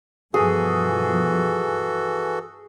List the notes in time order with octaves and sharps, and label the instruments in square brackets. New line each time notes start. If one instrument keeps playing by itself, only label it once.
[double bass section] G2 B2 F3 [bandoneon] E3 F#4 A4 [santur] G#4